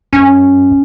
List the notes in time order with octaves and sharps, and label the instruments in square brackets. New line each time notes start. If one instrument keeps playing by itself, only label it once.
[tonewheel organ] F#2 [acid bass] C#4